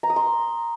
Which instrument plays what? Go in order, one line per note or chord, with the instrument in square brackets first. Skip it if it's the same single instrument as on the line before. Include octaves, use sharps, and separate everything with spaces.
[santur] A#5
D#6
C6